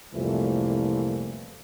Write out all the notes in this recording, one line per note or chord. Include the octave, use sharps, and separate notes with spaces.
C2 F2 A#2 E3 A3